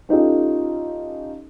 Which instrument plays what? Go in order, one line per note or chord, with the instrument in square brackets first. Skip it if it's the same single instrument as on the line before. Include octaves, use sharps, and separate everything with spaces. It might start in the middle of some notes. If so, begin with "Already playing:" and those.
[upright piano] C#4 D#4 F4 G4 A4